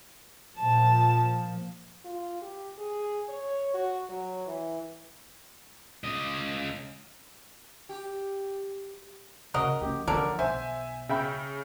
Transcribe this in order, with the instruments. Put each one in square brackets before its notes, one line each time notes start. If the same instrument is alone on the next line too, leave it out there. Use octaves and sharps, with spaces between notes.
[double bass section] A#2 F3 [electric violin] A5
[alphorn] F4
G4
G#4
C#5
F#4
F#3
E3
[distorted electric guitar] C#2 D#5
[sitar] G4
[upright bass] C#3 [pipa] F#4 A#4 D#5
[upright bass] F3 C#4 [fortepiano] G4
[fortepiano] D3 F6 [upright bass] F3 [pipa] C#4 D4 A#4
[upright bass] B1 [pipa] C5 [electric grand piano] E5 G#5
[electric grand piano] C#3 [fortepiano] E5 G5 B5